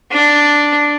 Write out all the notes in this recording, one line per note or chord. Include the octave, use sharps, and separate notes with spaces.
D4